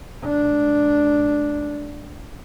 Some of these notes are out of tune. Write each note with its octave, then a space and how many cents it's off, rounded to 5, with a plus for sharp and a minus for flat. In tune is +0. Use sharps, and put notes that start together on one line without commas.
A3 -45 D4 +0